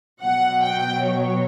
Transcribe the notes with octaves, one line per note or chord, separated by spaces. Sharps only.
B2 F#3 F#5
G5
C#5